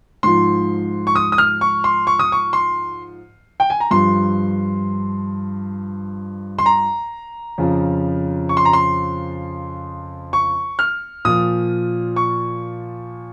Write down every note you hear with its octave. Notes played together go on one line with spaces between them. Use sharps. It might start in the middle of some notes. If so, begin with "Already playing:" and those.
G#2 F3 C6
C#6
D#6
D#6
F6
C#6
C6
C#6
D#6
C#6
C6
G5
G#5
A#5
G2 F3 C6
C6
A#5
F2 C#3 F3
C#6
C6
A#5
C6
C#6
F6
A#2 F3 D#6
C#6